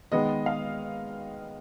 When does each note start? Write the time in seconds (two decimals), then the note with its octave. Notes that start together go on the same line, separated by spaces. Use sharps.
0.12 D#3 G#3 B3 D#5
0.46 F5